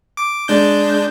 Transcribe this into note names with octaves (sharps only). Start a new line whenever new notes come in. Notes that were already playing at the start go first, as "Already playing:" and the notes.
D6
G#3 D4 G6